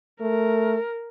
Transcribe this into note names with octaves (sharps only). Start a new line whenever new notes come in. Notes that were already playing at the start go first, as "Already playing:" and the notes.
A3 A#4